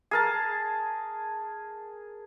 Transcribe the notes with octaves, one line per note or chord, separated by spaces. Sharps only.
G#4 A#4 A5